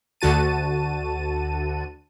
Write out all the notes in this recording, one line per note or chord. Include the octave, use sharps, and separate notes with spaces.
D2 D3 F#4 A5 D#7